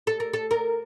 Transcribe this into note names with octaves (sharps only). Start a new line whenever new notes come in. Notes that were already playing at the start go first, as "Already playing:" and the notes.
A4
A#4
A4
A#4